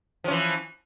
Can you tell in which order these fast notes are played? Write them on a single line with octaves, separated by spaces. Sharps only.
F3 C#4 E3